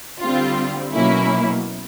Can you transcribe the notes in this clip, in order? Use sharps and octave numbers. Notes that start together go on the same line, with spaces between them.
D3 G3 C4 F4
B2 F#3 A#3 C#4 E4